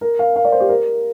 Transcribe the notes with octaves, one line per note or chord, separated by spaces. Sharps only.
A#4
F5
F5
D5
C5
G4
A#4